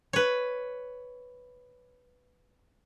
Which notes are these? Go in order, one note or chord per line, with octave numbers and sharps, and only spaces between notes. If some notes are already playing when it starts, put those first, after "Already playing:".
B4 C#5